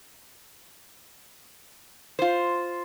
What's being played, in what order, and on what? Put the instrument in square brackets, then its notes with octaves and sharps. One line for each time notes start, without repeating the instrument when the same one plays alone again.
[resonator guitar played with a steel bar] F4 C5